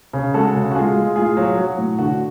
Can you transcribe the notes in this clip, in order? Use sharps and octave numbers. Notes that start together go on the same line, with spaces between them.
C#3
G#3 F#4 A4
C#3
F#4
G#3 F4 G#4
G#3
A2 F4 G#4
F#3
F#3 F#4
A2
D3 F#4